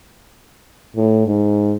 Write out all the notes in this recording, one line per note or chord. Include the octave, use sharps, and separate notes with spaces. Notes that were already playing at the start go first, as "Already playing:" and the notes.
A2
G#2